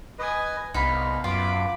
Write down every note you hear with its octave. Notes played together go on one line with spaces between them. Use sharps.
B4 D#5 G#5 D#6
C2 B3 D#4 F5 B5
F#2 F4 B4 F5 D6